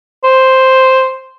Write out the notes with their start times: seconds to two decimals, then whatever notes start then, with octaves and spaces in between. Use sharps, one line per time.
0.24 C5